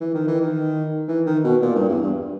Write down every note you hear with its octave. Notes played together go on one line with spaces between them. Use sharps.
E3
D#3
E3
D#3
E3
D#3
B2
A#2
G2
E2
G2